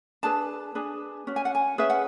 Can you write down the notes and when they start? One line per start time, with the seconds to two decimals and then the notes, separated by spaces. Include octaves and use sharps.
0.23 D4 G#4 B4 A5
0.75 D4 G#4 B4
1.27 C#4 F#4
1.36 G#5
1.45 F#5
1.55 G#5
1.78 C#4 G#4 B4 E5
1.90 F#5